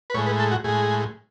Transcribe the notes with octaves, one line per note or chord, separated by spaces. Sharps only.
B4
A2 G#3 C#5
B4
A4
F#4
A2 G#3 G#4